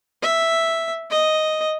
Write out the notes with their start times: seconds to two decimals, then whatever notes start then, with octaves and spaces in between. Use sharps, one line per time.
0.22 E5
1.10 D#5